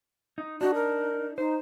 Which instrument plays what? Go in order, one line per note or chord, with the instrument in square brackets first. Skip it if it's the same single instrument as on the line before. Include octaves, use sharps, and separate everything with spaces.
[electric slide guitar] D#4
[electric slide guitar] D4 D#4 [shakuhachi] F#4
[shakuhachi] A#4
[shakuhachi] D#4 [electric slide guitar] C5